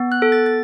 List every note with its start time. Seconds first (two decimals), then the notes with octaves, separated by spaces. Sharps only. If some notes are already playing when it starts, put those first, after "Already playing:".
Already playing: B3
0.12 F#6
0.22 A4
0.32 A6
0.46 A6